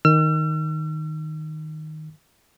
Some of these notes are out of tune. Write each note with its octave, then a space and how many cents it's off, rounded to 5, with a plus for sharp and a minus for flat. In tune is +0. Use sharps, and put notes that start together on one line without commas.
D#3 +0 E6 +45